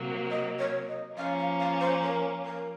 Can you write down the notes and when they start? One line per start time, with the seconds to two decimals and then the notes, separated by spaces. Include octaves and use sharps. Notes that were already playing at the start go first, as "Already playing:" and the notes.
Already playing: C3 F#3 A#3
0.31 D#5
0.59 C#5
0.89 D#5
1.17 F3 A#3 C#4 F5
1.38 F5
1.60 F5
1.81 C5
2.03 A#4
2.46 A#4